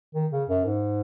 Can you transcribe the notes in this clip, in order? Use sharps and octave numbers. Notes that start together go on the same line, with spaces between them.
D#3
C#3
F#2
G#2